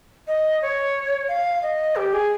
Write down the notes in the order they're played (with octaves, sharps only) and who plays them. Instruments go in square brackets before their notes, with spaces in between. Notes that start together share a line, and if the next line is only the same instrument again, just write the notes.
[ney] D#5
C#5
F5
D#5
G4
G#4